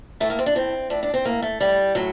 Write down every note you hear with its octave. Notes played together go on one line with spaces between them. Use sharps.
A2 A3
A#3
C4
D4
A2 C4
A2 D4
D4
C4
A2 A#3
A3
A2 G3
A2 F#3